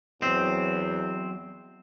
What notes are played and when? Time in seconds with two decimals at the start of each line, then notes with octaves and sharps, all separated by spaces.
0.22 E2 F#3 C4 D#5